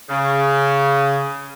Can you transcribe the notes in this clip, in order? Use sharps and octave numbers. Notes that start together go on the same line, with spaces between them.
C#3